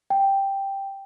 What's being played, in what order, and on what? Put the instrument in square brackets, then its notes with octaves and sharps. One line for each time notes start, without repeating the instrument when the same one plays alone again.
[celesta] G5